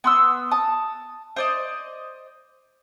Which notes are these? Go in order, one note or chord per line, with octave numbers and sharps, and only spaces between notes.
B3 C6 E6
A5 D#6
C5 D5 D#5